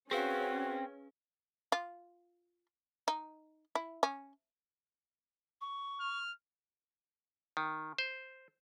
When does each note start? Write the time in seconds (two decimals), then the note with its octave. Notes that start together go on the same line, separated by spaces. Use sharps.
0.11 C4 C#4 F#4 G#4 B4 F5
1.72 F4
3.08 D#4
3.75 E4
4.03 C#4
5.61 C#6
6.00 F6
7.57 D#3
7.98 C5